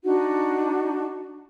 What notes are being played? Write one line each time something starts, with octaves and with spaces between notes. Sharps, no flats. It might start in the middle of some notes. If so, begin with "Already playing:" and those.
D4 D#4 F#4 F#5